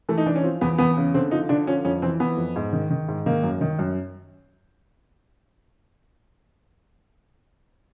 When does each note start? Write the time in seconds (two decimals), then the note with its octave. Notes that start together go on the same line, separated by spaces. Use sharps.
0.09 E3 A3
0.18 D#4
0.26 E3 D4
0.36 C#4
0.43 F3 C4
0.61 E2 B3
0.79 E2 B3
0.97 C#3
1.14 D3 C4
1.31 F3 D#4
1.49 D3 D4
1.67 F3 C#4
1.85 F2 C#4
2.02 E3 C4
2.20 E3 B3
2.37 F2
2.56 G#2
2.73 D#3
2.91 D#3
3.08 G#2
3.26 D#3 A#3
3.43 F#2
3.61 D#3
3.79 F#2